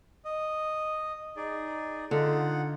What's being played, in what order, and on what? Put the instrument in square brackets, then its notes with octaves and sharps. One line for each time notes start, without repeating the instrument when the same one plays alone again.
[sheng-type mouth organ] D#5
D#4 G#4 D5
[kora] D3 [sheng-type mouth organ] D#4 F4 F#5